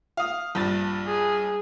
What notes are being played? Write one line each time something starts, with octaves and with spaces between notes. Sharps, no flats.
F5 D#6
A#1 G2 A6
G#4